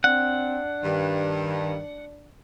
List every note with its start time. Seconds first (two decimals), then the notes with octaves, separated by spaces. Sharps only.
0.04 C4 D4 F#5
0.84 G2 D#3